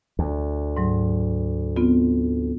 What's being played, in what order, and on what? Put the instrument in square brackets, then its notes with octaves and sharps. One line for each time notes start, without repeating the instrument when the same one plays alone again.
[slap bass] D2
[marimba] G#2 F#3
B3 C4 F4